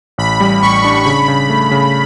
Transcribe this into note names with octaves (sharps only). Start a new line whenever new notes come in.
A1 B5
G3
A1 C#6
D4
C#3 B5
C#3
A3
C#3